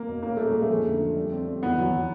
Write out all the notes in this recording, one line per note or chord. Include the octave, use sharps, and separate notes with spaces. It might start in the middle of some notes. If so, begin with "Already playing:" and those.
Already playing: A#3
B2
A#3 C#4
A3 C#4
G#3 C#4
A3
F2
D3
F3
G3
C4
G3
E2 B3
F#3
F#3